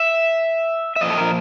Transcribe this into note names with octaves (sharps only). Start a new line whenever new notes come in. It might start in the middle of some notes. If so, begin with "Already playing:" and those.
Already playing: E5
E5
A#2 F3 D#5
A4
A#4